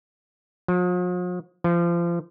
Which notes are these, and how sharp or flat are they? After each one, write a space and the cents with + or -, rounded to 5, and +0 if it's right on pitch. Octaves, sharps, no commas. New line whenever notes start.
F3 +45
F3 -30